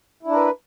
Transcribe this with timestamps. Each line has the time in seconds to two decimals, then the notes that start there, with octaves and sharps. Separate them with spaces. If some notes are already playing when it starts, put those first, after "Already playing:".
0.23 E4
0.27 D4
0.31 A#4
0.36 B4